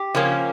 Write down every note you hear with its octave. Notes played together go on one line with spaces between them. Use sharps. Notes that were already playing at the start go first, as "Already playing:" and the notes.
Already playing: G4
C#3 F3 A#3 C#4